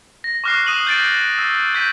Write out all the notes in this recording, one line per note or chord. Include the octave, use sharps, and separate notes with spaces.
A#6
C#6 D6 F6 F#6 A#6 C7
D#6 F#6 D#7 F7 F#7
G6 A6 D7
E6 D#7
G6 B6 D#7